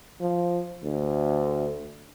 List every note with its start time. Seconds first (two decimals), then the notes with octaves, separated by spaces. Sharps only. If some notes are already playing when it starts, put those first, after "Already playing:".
0.20 F3
0.83 D2